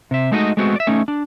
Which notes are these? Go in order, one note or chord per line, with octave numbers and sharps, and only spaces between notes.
C3 E5
G#3 A3 D#4 F#4 D5 D#5
G#3 A3 B3 C4 F#4
D5 E5
A3 C#4 D#4
D4